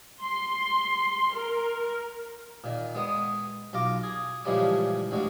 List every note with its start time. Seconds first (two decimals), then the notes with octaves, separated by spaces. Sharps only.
0.23 C6
1.34 A#4
2.64 A#2 D#3
2.95 G#3 B3 D#6
3.73 B1 F4 A#5 D6
4.03 G#4
4.45 A#2 C#3 E3 F3 G3 G#3
5.11 A1 D2 D3 G#3 F#4